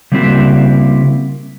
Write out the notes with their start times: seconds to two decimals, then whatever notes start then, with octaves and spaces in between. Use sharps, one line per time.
0.12 C#3 G3 A#3 C4 E4 F#4